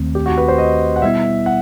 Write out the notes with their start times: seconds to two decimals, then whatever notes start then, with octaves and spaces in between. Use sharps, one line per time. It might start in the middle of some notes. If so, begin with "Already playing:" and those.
Already playing: D#2 D#3 A3 C4
0.15 G4
0.26 F#4
0.37 B4
0.48 C5
0.58 D#5
0.96 F#5
1.02 B2 G3 B3 E4 E5
1.46 F#5